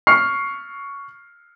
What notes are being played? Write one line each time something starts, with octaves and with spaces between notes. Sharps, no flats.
C#6 F6 C7